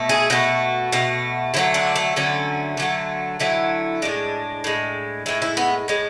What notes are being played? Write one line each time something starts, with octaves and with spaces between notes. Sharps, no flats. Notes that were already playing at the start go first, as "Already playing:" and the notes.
Already playing: B2 A3
G#4
B2 A3 F#4
B2 A3
D3 F#3 A3 E4
D4
A3
D3 F#3 A3 C#4
D3 F#3 A3
D3 F#3 A3 E4
A2 G#3 D4
A2 G#3
A2 G#3 E4
E4
B3
A2 G#3